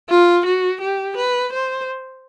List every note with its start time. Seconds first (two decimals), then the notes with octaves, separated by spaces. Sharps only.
0.09 F4
0.45 F#4
0.81 G4
1.16 B4
1.52 C5